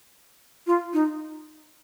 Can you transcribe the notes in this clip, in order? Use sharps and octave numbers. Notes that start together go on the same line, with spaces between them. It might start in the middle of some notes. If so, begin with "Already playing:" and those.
F4
D#4